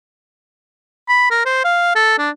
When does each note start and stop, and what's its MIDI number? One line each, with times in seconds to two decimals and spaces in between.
1.09 1.29 83
1.31 1.43 70
1.45 1.61 72
1.64 1.94 77
1.95 2.17 69
2.19 2.30 62